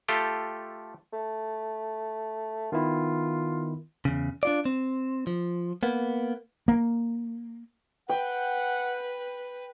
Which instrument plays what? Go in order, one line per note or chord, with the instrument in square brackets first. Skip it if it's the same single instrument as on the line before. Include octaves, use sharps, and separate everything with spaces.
[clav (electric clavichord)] A3 F4 G4 A4 G5
[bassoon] A3
[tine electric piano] D#3 B3 E4 [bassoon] F4
[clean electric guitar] E2 C#3
D4 F4 D5
C4
F3
A#3 B3
[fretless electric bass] A#3
[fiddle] B4 [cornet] F#5 [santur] G5